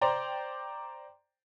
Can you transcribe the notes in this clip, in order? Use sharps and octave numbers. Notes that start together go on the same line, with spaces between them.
C5 D5 G5 A#5